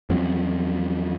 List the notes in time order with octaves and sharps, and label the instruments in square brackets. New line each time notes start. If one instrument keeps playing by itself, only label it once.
[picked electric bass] E2 F3 F#3 C4